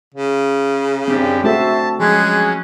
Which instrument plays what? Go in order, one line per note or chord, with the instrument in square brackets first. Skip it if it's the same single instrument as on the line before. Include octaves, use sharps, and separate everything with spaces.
[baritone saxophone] C#3
[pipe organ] F#2 G4 [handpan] C4 D4
[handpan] A3 F#4 A4 [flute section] C5 E5 [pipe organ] A5
[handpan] F3 [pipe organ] F#3 C#4 [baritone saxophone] G#3 [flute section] G#4 F#6 G#6